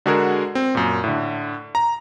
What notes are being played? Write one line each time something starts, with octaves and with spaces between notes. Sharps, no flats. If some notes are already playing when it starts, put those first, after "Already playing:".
D3 G#3 F#4 G#4 A#4
C4
F#2 A#2
A2 D3
A#5